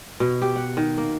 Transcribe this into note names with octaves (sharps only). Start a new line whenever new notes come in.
B2
G4
F#5
D#3
A#3